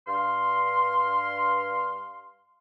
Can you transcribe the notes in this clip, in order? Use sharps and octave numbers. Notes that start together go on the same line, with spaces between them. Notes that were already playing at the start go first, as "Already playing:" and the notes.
G2 F5 C6